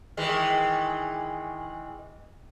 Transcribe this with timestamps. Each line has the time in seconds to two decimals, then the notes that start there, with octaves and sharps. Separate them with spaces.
0.17 D#3 E3 G#3